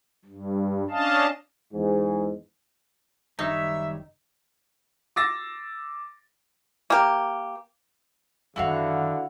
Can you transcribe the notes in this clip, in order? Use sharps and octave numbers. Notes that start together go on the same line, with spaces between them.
G2
C#4 D4 D#5 F5 A5
E2 G#2
F#1 D#3 G3 D#4 C#5 E5
D6 E6 A6 A#6
A#3 G4
F#2 D3 D#3 E4 F#4 F5